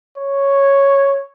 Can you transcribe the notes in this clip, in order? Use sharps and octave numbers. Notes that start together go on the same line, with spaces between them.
C#5